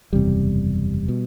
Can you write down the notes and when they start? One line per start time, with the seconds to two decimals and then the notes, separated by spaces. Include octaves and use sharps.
0.13 F#1 E2 C3 G3
1.08 B2